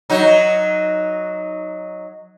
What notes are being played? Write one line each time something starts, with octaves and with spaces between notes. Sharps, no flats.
F#3 D#4